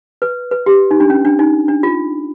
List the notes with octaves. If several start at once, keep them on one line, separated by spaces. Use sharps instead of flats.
B4
B4
G4
D#4
D4
C#4
D4
D#4
D4
F4